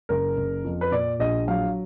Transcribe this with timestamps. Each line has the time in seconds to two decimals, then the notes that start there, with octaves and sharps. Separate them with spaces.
0.09 F#1 A#4
0.37 F#1
0.64 F2
0.81 B4
0.92 A#2 D5
1.20 A#1 D#5
1.47 F#3 F5